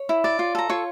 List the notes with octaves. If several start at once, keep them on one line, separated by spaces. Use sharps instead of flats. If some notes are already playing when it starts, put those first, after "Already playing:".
Already playing: C#5
E4
D5
F4
A4 A#5
F4 C#5 C#6